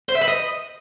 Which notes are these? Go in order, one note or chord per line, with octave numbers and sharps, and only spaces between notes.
C5
E5
B4
D#5